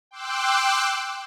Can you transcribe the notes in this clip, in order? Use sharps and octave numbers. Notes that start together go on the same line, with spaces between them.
G5 C6 D6 E6 F#6